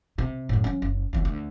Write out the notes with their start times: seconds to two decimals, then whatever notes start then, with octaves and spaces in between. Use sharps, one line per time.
0.18 C3
0.49 F#2 A2
0.64 F#3 C#4
0.82 F#1
1.13 F1 E2
1.25 D2